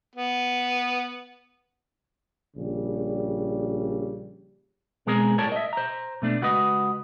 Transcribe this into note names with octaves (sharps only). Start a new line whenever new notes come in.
B3
A#1 C#3 G3
B2 G#3 C4 G#4 A#4
A2 G3 A#4 C#5 A5
D#5 E5
C5 A#5
B2 A3 D4
C#2 F#4 B4 D#5